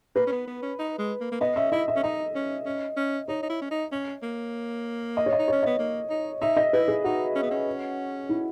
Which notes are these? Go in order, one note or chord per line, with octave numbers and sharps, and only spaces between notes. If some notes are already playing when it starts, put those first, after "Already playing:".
A#3 B4
C#4
B3
B3
C#4
D#4
G#3
A#3
A#3
B3 D#5
C#4 E5
E4 D#5
E5
C#4
D#4 D#5
C#4
C#4
C#4
D#4 C#5
D#4
E4
C#4
D#4
C#4
A#3
D#5
C#5
D#5
D#4
C#4 C#5
B3 D#5
A#3
D#4
D#4 E5
D#5
E4 B4
G#4
D#4 F#4
C#4
B3
C#4
E4